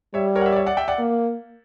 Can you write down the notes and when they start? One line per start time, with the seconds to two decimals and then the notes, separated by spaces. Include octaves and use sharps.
0.14 G3 C#5 E5
0.35 A#4 C#5
0.41 F#5
0.46 C#5 E5
0.52 D5
0.56 C#5 E5
0.66 D5 F#5
0.77 E5 G5
0.88 D5 F#5
0.98 A#3